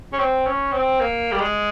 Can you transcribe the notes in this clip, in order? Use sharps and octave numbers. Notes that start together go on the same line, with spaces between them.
C#4
C4
C#4
C4
A#3
G3
G#3